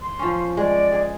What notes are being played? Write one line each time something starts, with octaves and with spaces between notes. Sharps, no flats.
C6
F3 C#4
G#3 D5
G#4